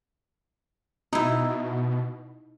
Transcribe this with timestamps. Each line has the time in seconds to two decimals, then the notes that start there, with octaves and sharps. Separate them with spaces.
1.13 B2 D#4 E4